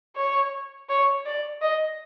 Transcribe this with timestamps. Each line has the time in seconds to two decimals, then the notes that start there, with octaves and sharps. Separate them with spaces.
0.16 C#5
0.89 C#5
1.26 D5
1.61 D#5